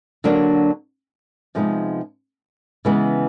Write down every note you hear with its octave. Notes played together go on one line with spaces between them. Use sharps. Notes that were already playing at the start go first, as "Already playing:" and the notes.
D3 F#3 A#3 D4 F#4
C3 F3 G#3 B3 D#4
C#3 E3 G#3 B3